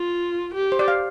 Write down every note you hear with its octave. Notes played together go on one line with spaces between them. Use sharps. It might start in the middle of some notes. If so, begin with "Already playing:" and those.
Already playing: F4
G4
C5
D5
F5